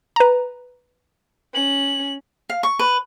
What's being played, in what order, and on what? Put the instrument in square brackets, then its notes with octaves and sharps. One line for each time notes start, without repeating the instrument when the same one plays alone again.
[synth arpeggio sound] B4 A#5
[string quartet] C#4 [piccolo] F#7
[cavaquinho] F5
C#6
B4